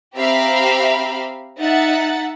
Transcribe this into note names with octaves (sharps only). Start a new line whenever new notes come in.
C4 G4 E5 F5 A#5 B5
D#4 E5 F#5 A6